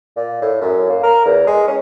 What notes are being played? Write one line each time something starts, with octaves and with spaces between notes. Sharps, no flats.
A#2
A2
F#2
A#3
A#4
E2
G#3
C#4